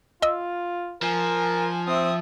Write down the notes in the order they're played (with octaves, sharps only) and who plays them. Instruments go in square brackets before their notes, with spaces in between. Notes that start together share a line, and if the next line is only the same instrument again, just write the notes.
[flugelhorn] F4 [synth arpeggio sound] D#5 E6
[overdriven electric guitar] F3 [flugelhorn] A#4 [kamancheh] G#5
[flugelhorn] C4 [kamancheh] E5 D#6